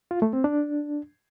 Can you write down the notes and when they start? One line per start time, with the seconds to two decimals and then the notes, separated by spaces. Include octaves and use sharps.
0.11 F4
0.22 A3
0.33 C4
0.44 D4